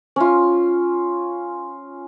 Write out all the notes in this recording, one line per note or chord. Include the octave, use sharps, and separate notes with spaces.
C#4 F4